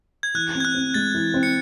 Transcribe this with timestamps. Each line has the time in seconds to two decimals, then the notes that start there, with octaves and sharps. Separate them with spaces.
0.23 G#6
0.34 E3 F#6
0.55 C4
0.60 G#6
0.65 F#6
0.75 C4
0.94 G#3 A6
1.14 E3
1.34 C4
1.43 C#7